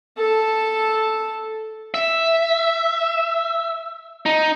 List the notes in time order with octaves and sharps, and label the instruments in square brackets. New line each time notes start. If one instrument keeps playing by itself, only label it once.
[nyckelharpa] A4 A5
[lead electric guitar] E5
D#4